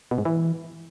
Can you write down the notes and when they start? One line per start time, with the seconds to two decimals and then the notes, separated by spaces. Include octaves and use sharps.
0.11 B2
0.18 G#2
0.25 E3